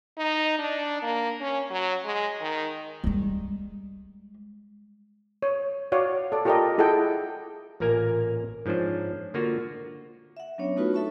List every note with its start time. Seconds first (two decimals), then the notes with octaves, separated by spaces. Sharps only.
0.18 D#4
0.59 D4
1.03 A#3
1.41 C#4
1.70 F#3
2.05 G#3
2.41 D#3
3.04 G3 G#3
5.42 C#5
5.92 F#4 C#5 D5 F5
6.32 A4 D5
6.45 F4 G4 A4 A#4 D5 D#5
6.78 E4 G#4 A4 D#5 F#5 G5
7.80 A1 A#2 A#3 A#4 G#5 A#5
8.66 G#2 F3 C#4 D4 C5
9.34 D3 A#3 F4 F#4
10.37 E5 F#5
10.58 F#3 B3 C#4 D4 C#5
10.76 A3 B3 D#4 F4 F#4 B4
10.93 A4 E5 A5 C#6